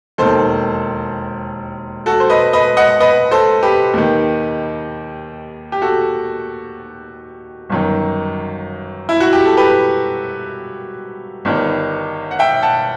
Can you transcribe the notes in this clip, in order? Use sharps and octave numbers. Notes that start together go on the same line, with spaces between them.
E1 D#2 D#3 A4 C5
F#4 A4
C5
B4 D#5
B4 D#5
D#5 F#5
B4 D#5
A4 C5
G4 B4
D#2 D#3
G4
F#4 A4
G1 F#2 D#3
E4
F#4
G4
A4
G4 B4
G1 G2 D#3
F#5
E5 G5
F#5 A5